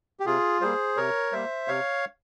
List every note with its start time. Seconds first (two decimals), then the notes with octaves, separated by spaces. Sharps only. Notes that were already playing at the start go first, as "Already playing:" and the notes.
0.20 G4
0.26 C3 F4 G#4
0.61 G3 A#3 G#4 C5
0.97 C3 A#4 C#5
1.32 G3 A#3 C5 E5
1.68 C3 C#5 F5